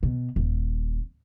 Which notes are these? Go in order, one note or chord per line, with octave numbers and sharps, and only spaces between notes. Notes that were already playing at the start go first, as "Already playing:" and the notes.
B2
D#1